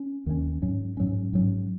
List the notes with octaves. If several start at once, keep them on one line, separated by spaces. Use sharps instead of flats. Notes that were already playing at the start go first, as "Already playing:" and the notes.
Already playing: C#4
D#2 D#3 F#3 C#4
G#2 F#3 C#4
G#2 F#3 C#4
G#2 F#3 C#4